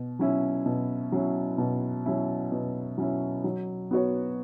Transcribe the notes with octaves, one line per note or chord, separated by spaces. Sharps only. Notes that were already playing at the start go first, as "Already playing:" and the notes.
Already playing: B2
F#3 C#4 E4
B2
F#3 C#4 E4
B2
F#3 C#4 E4
B2
F#3 C#4 E4
F#3
B3 F#4 C#5